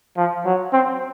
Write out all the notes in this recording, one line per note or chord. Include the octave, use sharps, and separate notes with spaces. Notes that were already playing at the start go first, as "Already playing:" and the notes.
F3
F#3
C4